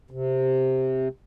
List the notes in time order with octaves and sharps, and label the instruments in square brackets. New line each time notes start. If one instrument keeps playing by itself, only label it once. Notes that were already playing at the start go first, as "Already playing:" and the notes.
[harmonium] C3